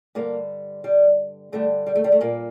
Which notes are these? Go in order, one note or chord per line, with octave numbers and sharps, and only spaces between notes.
G2 A#2 D3 G3 A#3
G3
G2 D3 G3 A3
G3
A3
G3
A3
A#2 A#3